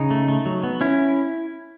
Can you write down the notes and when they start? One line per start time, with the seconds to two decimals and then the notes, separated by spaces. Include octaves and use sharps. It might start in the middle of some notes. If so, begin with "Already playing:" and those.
Already playing: C#3 D#4
0.10 A3
0.28 A3
0.46 F#3
0.63 B3
0.81 C#4 E4